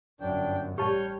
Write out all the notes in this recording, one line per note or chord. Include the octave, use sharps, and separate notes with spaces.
G1 F#2 D4 G5
A1 G3 G4 C#5 A5 F6 G6